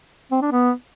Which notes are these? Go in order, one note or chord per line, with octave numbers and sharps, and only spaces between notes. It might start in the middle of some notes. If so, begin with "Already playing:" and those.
C4
D4
B3